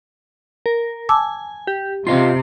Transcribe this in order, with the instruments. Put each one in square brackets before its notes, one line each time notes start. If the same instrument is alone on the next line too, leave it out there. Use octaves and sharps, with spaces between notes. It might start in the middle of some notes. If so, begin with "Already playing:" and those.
[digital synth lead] A#4
[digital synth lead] G#5 [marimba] A5 D6 E6
[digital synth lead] G4
[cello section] C3 [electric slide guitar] F4 D#5 F5 [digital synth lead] C7